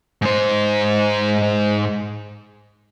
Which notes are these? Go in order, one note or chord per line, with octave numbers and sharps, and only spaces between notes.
G#2 C5